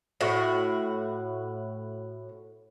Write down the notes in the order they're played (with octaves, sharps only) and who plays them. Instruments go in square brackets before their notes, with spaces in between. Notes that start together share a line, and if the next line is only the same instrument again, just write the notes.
[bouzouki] A2 F#4